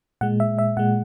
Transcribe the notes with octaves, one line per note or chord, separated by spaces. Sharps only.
A#2 G#3 F#5
E5
E5
A#2 G#3 F#5